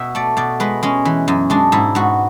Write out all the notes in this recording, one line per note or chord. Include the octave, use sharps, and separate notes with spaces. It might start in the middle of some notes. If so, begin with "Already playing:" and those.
Already playing: B2 E5
A3 D5
B2 D5
G#3 B4
G#3 C#4
E3
F#2
G#3 D4
G#2 E4
G#2 F#4